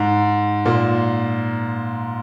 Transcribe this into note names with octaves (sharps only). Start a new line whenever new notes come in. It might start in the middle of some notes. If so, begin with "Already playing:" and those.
Already playing: G#2
A#2